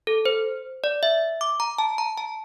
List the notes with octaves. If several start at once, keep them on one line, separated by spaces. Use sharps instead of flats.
A4
C5
D5
E5
D6
A#5
A5
A#5
A5